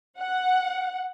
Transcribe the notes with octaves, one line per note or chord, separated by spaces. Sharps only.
F#5